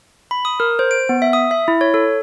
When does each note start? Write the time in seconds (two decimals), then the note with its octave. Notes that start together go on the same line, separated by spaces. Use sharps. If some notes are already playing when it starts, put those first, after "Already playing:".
0.31 B5
0.45 D#6
0.60 A#4
0.79 C5
0.91 D7
1.09 B3
1.22 E5
1.33 D#6
1.51 E5
1.68 E4
1.81 C#5
1.94 A4